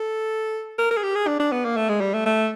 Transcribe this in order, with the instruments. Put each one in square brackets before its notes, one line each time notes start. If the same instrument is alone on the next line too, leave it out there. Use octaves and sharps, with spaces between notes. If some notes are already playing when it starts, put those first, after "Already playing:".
Already playing: [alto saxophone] A4
A#4
A#4
G#4
G4
G#4
D4
D4
B3
A#3
A3
G#3
G3
A3
A3